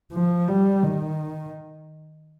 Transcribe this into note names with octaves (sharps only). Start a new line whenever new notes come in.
F3
G3
D#3